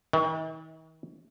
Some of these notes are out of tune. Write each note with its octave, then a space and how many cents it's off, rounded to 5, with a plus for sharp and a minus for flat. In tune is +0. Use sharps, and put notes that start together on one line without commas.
D#3 +45